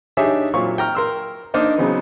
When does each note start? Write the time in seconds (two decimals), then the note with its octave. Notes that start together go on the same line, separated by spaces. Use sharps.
0.17 D4 D#4 G4 G#4 C#5 E5
0.54 A#2 F#3 C4 F5 C#6
0.78 G5 A#5 F6
0.95 A#4 C6 E6
1.54 A#3 D4 D#4 A#4 C5 D#5
1.78 C#3 F#3 B3 C4 D#4